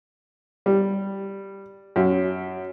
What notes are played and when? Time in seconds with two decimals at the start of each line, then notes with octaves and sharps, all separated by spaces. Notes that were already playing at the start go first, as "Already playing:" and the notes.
0.66 G3
1.96 F#2